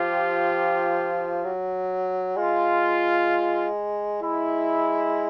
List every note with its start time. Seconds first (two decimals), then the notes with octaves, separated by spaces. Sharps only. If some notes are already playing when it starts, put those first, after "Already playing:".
Already playing: F3 F4 G4
1.44 F#3
2.37 G#3 F4
4.22 G#3 E4